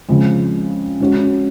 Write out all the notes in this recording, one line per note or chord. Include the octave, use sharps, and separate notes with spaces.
C#3 F3 G#3 C4
G#3 C#4 F#4